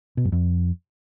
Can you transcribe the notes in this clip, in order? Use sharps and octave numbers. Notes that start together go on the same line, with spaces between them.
B2
F#2
F2